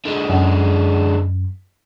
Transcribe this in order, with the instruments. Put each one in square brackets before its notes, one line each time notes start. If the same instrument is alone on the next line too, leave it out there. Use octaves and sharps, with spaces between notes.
[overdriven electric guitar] D3 G#3
[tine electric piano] F#2